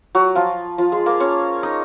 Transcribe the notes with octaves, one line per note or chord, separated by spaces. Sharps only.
F#3 F#4
F3 F4
F3 F4
G#3 G#4
A#3 A#4
C#4 C#5
D#4 D#5